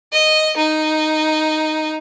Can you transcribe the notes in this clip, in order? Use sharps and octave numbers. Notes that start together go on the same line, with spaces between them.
D#5
D#4